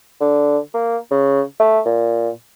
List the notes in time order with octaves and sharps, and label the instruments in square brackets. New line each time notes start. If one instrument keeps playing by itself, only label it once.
[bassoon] D3
A#3
C#3
A3
A#2